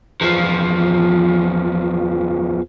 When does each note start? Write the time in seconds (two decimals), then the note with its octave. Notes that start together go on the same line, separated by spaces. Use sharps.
0.21 E2 F3